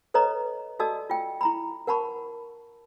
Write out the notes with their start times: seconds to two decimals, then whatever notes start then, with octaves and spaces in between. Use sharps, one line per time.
0.14 A4 B4 C#5 D#5 A#5
0.79 F#4 A4 D5 D#5 A5 E6
1.10 F4 G5
1.41 E4 A#5 B5
1.87 A#4 F#5 A5 B5 C#6